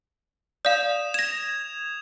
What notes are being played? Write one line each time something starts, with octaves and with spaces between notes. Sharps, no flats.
D5 F5 D#6 E7
G#6 A#6 E7 F7